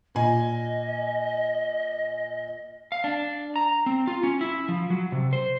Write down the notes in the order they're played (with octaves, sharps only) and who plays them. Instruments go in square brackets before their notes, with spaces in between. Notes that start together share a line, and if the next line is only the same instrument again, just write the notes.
[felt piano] A#2 G#5 [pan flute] D#5
[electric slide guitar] F5
D4
A#5
C4
F4
C#4
E4
F3
F#3
C3
C5